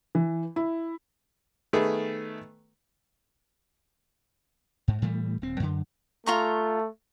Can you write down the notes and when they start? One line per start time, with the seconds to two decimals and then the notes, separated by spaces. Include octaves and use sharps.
0.15 E3
0.56 E4
1.73 D#3 A3 B3 G#4
4.88 G#2
5.02 A2 E3 G3 A3
5.42 D#1 C4
5.60 F#2 D3
6.26 A3 F4 A#5 C#6